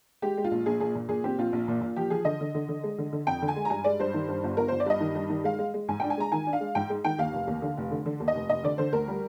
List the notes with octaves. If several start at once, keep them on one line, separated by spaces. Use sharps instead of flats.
G#3 G4
G#3
F4
A#1
A#1 G#4
A#2 G#4
A#2
A#2 G#4
C4 G4
A#1 F4
A#1
A#2
A#2
F3 G4
F3 G#4
D3 D#5
D3
D3
D3
G#3
D3
D3
F2 G5
D3
G#5
G#3
A#5
G2 G#5
G#3 D5
G2 C5
D#3
G2
G1
G1 A#4
G1 C5
D5
G2 D#5
D#3
G2
D#3
G#3 F5
G#3
G#3
G#2 G#5
D4 G5
G#5
G#3 A#5
D#3 G#5
D4
F5
G#3
G#2 G5
G#3
D#3 G5
D#2 F5
F1
D#2
D3
F1
D3
D3
D#2
D#5
F1
F1 D#5
D3 D5
D3 C5
D2 A#4
G3